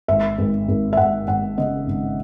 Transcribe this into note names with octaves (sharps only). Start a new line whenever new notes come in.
G#1 E5
G#1
G#1
E5
G#1 F#5
G#1 F#5
C#3 D#5
G#1